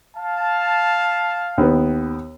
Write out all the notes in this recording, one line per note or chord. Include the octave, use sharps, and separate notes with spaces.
F5 A5
D#2 B3